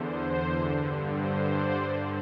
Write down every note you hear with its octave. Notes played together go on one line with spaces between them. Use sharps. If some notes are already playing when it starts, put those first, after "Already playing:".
Already playing: E2 D3 C5
G2 D3
C5
D5
G2 D3